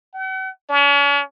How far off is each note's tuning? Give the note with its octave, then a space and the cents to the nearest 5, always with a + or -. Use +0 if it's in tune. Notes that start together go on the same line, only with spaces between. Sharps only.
F#5 +45
C#4 +40